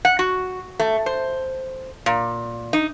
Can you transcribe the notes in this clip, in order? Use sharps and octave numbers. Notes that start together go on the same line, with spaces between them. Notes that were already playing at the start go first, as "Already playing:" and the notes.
F#5
F#4
A3
C5
A#2
D#4